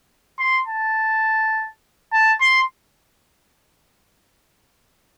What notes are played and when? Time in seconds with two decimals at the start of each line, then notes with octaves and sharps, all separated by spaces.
0.39 C6
0.68 A5
2.13 A5
2.41 C6